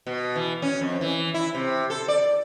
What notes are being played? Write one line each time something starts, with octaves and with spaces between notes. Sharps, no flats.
B2
E3
C#4
F2
E3
E4
C3
A4
D5